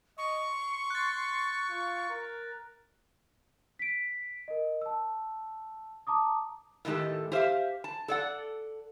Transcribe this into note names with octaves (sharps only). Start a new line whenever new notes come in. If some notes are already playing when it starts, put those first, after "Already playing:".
D#5 C#6
C6
F#6 A6
F4
A#4
B6 D7
A#4 D#5
A5 E6
A5 A#5 D6 D#6
A2 D3 D#3 G#3 G4 A4
G4 C5 E5 F5
A5
A4 D5 F#5